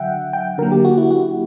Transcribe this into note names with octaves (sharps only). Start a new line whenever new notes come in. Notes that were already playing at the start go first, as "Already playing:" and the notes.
Already playing: D3 F#3 E5 F#5 G5
G5
D3 F#3 A#3 A#4
G4
F#4
E4
F#4